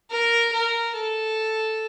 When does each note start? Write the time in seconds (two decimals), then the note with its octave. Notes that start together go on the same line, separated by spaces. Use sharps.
0.11 A#4
0.53 A#4
0.96 A4